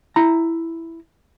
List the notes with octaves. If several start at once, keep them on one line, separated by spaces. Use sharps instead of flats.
E4 A#5